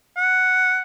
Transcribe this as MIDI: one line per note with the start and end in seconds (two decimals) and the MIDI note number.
0.17 0.82 78